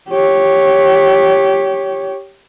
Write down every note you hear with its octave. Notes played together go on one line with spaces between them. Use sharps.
G4 C#5